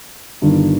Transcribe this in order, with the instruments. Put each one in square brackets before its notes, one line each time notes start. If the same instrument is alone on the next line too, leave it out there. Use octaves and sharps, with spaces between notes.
[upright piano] G1 G2 D#3